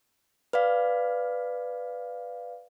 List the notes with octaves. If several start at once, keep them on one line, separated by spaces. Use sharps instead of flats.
B4 D5 F5